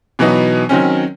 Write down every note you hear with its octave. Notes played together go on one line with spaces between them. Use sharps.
B2 E3 F#3 B3 D#4
D#3 F#3 C4 C#4